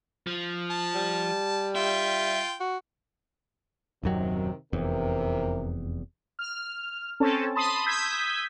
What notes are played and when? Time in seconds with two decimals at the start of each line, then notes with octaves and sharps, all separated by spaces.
0.27 F3
0.71 A5
0.94 G3
1.76 F4 E5 G5
2.60 F#4
4.03 D#1 F#2 C3 D#3 F#3
4.73 F1 E2 C3 E3 A#4
6.39 F6
7.20 C4 C#4 A4 A5
7.55 A5 B5 C6 D#6
7.86 D#6 E6 G6 G#6 B6